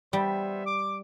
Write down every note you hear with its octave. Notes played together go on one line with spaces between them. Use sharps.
G3 B3 C5 E5
D6